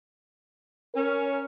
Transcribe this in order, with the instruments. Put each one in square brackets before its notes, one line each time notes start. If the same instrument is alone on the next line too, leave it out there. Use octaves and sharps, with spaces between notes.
[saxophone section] C#4 [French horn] A#4